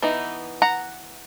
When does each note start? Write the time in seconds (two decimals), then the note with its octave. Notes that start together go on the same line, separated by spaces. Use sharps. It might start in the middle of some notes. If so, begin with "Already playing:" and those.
0.02 E3 B3 D#4
0.62 F#5 A#5